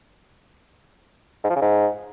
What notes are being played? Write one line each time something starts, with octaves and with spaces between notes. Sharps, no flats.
G#2
F3
C#3
G#2